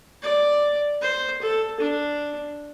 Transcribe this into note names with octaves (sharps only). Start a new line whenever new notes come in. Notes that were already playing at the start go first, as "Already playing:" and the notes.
D5
C5
A4
D4